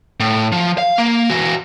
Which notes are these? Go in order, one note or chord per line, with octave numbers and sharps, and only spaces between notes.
A2
F3
F5
A#3
E3 F#4